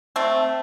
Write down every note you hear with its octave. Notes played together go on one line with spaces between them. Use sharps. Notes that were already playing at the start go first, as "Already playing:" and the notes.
A3 C4